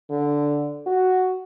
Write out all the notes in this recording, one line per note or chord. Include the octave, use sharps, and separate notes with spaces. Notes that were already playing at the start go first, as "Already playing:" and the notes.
D3
F#4